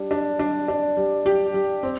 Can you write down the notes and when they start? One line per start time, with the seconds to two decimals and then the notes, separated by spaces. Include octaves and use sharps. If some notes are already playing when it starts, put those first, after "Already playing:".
Already playing: G3 D4
0.11 D4
0.39 D4
0.68 D4
0.97 G3
1.26 G4
1.54 G3
1.83 C4